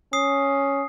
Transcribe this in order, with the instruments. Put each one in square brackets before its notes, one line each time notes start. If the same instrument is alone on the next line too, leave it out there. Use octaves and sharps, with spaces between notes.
[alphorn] C#4 [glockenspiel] D#6 C7